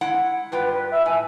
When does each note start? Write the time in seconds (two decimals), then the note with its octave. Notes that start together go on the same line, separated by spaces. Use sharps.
0.01 G#3 E4 F#5
0.52 G2 F4 B4 G5
0.73 B4
0.91 E5
1.06 A2 G#5